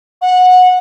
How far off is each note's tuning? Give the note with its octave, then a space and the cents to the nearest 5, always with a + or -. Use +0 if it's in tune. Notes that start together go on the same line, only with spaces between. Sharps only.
F#5 -20